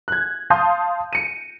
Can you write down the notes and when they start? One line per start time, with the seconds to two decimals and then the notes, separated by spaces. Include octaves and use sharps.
0.08 F#6 G#6
0.50 F5 A5 C6 D#6 G6
1.13 C#7 D#7